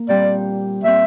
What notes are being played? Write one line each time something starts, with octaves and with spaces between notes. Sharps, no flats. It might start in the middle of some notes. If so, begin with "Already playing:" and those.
Already playing: A#3
A#2 G3 C4 D5
A#2 G3 C4 E5